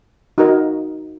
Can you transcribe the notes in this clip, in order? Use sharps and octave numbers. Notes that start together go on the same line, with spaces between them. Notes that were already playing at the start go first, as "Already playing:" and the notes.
D#4 F#4 A#4 D#5